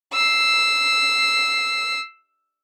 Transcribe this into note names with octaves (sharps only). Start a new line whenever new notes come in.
E6 C7